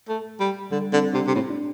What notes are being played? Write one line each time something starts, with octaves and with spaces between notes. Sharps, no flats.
A3
G3
D3 G3
D3 C4
C3 D4
C3
A2 C4
D4